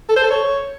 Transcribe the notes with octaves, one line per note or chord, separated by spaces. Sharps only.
A4
C5
A4
C#5